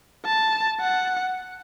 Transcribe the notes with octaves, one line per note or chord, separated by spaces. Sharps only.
A5
F#5